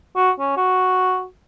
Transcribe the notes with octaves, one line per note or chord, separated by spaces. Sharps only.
F#4
C#4
F#4